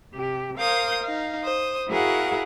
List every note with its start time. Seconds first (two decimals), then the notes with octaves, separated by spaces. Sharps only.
0.12 C3 G4
0.58 A#4 C5 F5 D#6 G6
1.02 D#4 F5
1.43 C5 D#6
1.89 E4 F#4 G#4 A#4 F5 F#5